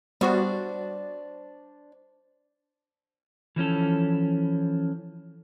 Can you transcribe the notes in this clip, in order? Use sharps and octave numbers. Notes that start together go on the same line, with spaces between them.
G3 B3 D4 F#4 C5 D5
E3 F3 C#4 A4